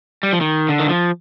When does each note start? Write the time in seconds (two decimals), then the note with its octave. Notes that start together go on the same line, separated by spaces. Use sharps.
0.23 G3
0.33 F3
0.41 D#3
0.68 D3
0.80 D#3
0.89 F3